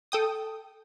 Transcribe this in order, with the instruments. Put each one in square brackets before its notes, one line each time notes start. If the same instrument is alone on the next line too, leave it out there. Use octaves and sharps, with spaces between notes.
[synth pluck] A4 G5 D#6